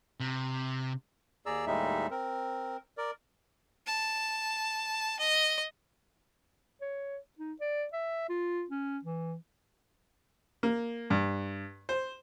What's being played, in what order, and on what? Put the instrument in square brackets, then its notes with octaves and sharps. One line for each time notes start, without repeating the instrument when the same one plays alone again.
[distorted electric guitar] C3
[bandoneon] D#2 G#4 D5 A#5 E6
D#2 A2 G3 G#3 D#4 E5
C4 A#4
A#4 D5
[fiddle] A5
D#5
[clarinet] C#5
D#4
D5
E5
F4
C#4
E3
[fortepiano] A#3
G2
C5